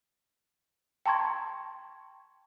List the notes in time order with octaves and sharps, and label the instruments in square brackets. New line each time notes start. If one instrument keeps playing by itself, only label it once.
[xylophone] G5 A5 A#5 C6 C#6 G#6